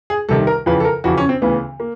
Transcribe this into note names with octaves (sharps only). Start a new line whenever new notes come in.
G#4
C2 C3 D#3 A4
A#4
F2 C#3 E3 B4
A4
A#4
F2 C#3 E3 F#4
C#4
C4
D2 C#3 E3 B3
A#3